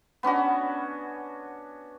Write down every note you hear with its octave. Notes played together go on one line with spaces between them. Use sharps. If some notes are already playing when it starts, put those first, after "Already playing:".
B3 C#4 D4 F#4